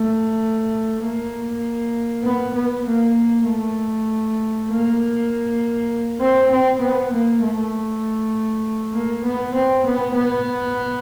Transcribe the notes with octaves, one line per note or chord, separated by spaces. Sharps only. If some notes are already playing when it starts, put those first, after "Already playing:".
Already playing: A3
A#3
B3
B3
A#3
A3
A#3
C4
C4
B3
A#3
A3
A#3
B3
C4
B3
B3